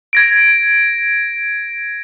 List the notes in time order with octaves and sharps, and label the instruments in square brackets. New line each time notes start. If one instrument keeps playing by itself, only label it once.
[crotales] G#6 A#6 D7